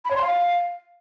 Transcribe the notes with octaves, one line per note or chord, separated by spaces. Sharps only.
B5
C#5
C6
F5